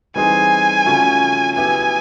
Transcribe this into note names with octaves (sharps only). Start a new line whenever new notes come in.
E3 G3 C4 D#4 G#4 G#5
C#3 F3 A3 C#4 F#4
F#3 B3 E4 G4 G#5